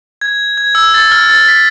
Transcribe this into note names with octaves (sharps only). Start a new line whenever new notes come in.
G#6
G#6
E6
A6
F6
A6
B6